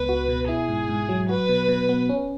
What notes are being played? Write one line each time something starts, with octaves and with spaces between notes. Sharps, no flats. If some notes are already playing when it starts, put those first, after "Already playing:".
Already playing: C#2 B3 B4
F#4
B2
E4 G#4
G#2
G#2
F#3
F#4 B4
B2
B2
B3
C#4